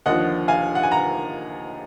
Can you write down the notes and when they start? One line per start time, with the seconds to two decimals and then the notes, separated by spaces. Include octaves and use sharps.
0.06 D#2 D3 F3 D#5 F#5
0.48 F5 G#5
0.75 F#5
0.83 G#5
0.91 F#5 A#5